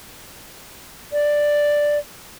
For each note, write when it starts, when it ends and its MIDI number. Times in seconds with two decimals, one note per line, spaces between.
1.13 1.98 74